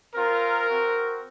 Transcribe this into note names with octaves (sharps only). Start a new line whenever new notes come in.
C4 F4 A#4
C4 F#4